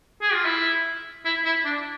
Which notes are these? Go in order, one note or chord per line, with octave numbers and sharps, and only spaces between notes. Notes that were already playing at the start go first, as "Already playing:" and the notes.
G#4
F4
E4
E4
E4
D4